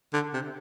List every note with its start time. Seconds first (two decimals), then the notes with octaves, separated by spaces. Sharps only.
0.13 D3
0.33 C3